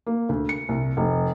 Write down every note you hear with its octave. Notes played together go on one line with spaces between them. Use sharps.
A#3
D2
C#7
C2
F1